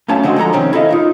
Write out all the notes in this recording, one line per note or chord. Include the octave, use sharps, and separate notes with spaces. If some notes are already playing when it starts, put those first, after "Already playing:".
F#2 A3 C#4 F5 A5
D3 E3 G#3 C4 F#4 C6
D3 F3 G#3 A4 A#5
C3 D#3 C4 C#4
E4 G#4 A4 B4 D#5 F5
D#4 F4 A#4